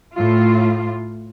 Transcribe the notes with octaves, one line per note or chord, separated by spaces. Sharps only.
A2 F4